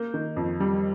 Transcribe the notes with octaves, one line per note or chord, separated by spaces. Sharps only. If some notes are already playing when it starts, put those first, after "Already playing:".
Already playing: A#3 G6
D#3
F2
G3